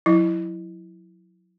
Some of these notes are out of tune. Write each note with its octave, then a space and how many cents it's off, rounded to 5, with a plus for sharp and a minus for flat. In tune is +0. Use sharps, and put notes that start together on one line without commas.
F#3 -30 E4 +0